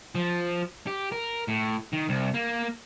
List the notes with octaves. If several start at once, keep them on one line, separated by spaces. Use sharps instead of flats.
F3
G4
A#4
A2
D#3
C2
A#3